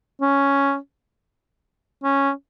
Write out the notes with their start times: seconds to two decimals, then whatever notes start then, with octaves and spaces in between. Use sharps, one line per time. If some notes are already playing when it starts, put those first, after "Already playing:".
0.21 C#4
2.04 C#4